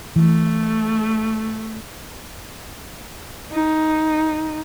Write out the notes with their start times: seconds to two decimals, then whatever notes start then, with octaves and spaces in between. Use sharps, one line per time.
0.16 E3 A3
3.51 D#4